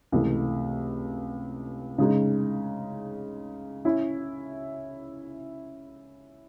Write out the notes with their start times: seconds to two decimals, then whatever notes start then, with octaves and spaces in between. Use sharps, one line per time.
0.12 C#2 C3 E3 A3
1.98 C#3 G#3 D#4
3.85 C#4 E4